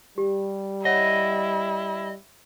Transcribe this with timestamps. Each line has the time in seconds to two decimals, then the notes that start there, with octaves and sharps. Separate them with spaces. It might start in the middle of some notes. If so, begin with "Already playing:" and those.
0.18 G3 G4
0.85 E4 C#5 D#5 F#5